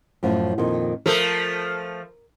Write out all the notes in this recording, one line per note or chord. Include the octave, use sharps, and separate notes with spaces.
F#2 A2 F3
F2 A#2 D#3
F3 A3 A4 A#4